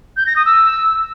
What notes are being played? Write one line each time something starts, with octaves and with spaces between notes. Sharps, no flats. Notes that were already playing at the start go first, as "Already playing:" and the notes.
G6
A#6
D#6
E6